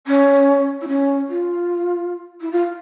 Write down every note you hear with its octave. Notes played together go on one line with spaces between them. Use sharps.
C#4
E4
C#4
F4
E4
F4